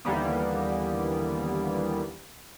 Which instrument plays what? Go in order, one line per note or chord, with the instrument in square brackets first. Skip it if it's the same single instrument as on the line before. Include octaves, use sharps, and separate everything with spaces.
[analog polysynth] D#2 D3 E3 G3 A#3 B3